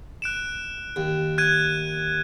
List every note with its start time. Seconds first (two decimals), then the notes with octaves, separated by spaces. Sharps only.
0.22 F#6 D7 E7
0.96 D#2
1.38 F#6 G#6 D#7